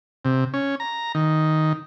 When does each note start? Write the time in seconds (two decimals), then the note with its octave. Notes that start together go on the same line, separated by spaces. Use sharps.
0.25 C3
0.54 C#4
0.80 A#5
1.15 D#3